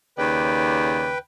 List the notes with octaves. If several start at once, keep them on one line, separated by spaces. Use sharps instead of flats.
D#2 C#3 B4 D5 G5